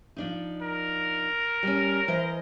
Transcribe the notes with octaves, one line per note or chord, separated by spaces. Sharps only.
F3 D4 D#4
A#4
G3 C#4
E3 C5 D#5